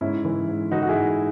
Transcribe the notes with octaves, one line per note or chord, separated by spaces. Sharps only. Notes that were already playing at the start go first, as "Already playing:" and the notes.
G#2 C#4 E4
E3
G#2
E3 D#4 F#4
F#4
E4 G#4
G#2